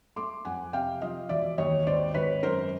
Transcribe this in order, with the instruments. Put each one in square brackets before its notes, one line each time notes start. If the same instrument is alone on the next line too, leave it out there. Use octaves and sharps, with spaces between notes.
[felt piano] A3 C6 D6
F2 F#5 G#5
C3 F5 G5
F3 D#5 F5
E1 D5 E5
D#2 C#5 D#5
G#1 C5 D5
G#1 B4 C#5
F#2 A#4 C5